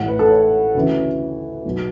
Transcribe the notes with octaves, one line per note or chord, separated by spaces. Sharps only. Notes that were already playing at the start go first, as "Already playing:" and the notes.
Already playing: A1 A2 E3 F#5
B4
A4
C#5
D2 C#3 E3
B1 B2